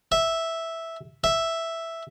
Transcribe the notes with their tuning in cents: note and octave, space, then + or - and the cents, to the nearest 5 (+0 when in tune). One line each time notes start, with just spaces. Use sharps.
E5 -5
E5 +0